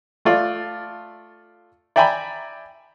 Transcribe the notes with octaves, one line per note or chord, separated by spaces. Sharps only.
A3 F4 D5
D5 E5 G5 G#5 A#5 B5